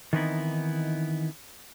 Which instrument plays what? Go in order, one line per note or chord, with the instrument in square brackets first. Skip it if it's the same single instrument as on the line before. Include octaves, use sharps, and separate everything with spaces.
[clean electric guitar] D#3 E3 B3 C4 D#4 E4